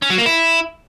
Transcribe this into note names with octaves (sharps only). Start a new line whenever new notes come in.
C#4
F#3
A#3
E4